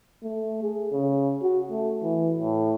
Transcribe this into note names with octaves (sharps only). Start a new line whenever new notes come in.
A3
G#4
C#3
F#4
A3
E3
A2